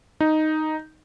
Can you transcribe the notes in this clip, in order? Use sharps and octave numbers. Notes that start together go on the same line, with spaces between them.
D#4